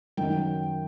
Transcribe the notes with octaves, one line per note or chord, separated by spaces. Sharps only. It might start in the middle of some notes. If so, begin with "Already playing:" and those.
F#2 D#3 F#3 G5